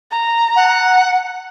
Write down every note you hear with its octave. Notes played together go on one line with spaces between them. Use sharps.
A#5
F#5